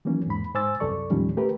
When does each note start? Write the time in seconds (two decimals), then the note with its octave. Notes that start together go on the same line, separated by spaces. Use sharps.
0.05 D#3 E3 F#3 A#3 C#4
0.26 E2 G#2 B5
0.55 G#2 C5 G#5 D6 E6 A6
0.80 C2 F#2 A4 D5 C#6
1.10 D#2 A2 D#3 F3 G3 C#4
1.37 A3 G4 A#4 B4